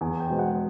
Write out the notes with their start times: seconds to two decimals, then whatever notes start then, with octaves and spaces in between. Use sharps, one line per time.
0.01 E2 G#5
0.20 G5
0.30 B2 G#3 C4
0.39 F#5